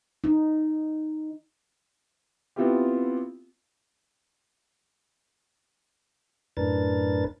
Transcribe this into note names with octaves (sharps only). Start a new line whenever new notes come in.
D#4
B3 C4 E4 F4 G4
F#2 A2 D4 A#4 B4 A6